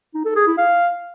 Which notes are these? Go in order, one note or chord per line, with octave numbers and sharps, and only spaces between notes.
D#4
A4
G#4
E4
F5